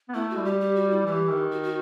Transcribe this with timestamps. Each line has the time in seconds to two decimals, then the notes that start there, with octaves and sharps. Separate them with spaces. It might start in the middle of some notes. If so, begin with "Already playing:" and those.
0.09 B3
0.14 A3 E4
0.30 F#4
0.38 G3
0.45 G4
0.61 G4
0.76 F#4
0.91 E4
1.06 E3 G4
1.29 D#3
1.52 F#4
1.63 F#4